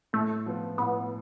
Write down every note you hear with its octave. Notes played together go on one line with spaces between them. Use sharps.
A2 A3
F3 B3
A2 B3